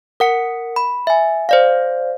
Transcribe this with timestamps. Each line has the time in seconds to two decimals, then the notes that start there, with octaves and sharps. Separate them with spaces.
0.20 A#4 F#5 C#7
0.76 B5
1.07 E5 G#5
1.49 C5 D5 F5